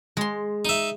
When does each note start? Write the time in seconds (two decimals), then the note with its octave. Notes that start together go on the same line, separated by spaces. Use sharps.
0.17 G#3 C6
0.65 D#4 E5